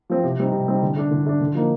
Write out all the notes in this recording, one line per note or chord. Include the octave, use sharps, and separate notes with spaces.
F3 C4
C3
G3 C4 D#4
C3
G3 C4 D#4
D3
A3 D4
D3
A3 D4
D3
F3 A#3 D#4